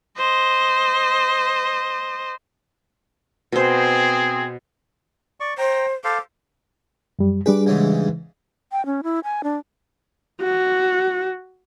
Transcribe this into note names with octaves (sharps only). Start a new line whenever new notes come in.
C5 D#5
B2 C4 G#4 C5
D5 C#6
C5 G5 A#5
A4 C5 F5 D6
F#2 G3
G3 D4 G#4 B4 D6
G#2 C#3 E3
G5
C#4
E4
G#5
D4
F#4